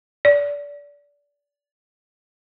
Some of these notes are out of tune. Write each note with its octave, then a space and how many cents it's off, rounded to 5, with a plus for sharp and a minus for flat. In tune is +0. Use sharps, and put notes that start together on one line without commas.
D5 -25